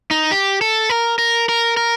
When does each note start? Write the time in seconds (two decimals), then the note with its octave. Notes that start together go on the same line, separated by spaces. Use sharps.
0.11 D#4
0.32 G4
0.61 A4
0.89 A#4
1.18 A#4
1.49 A#4
1.77 A#4